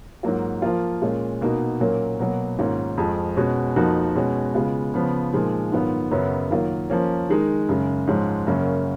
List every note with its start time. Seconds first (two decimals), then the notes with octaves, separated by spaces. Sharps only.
0.23 G#2 F#3 A#3 F4
0.62 F3 A#3 F4
1.02 A#2 G#3 C#4 F4
1.41 B2 A#3 D#4 F#4
1.80 A#2 F#3 A#3 C#4
2.19 B2 F#3 A#3
2.58 G#2 D#3 A#3 C#4 F4
2.98 F2 F3 G#3
3.37 B2 G#3 C#4 F#4
3.76 F2 F3 A#3 D#4 F#4
4.15 B2 G#3 C#4 F#4
4.55 C#3 G#3 B3 F4
4.94 C#3 F3 B3
5.33 A#2 F3 G#3 D#4
5.72 G#2 D#3 F#3 B3 F4
6.11 F#2 C#3 F#3 B3
6.51 D#3 F#3 A#3 F4
6.90 F3 A#3 C#4
7.29 D#3 G#3 D#4
7.69 F#2 C#3 G#3
8.07 G#2 F3 G#3 C#4
8.47 F#2 C#3 F#3 A#3 C#4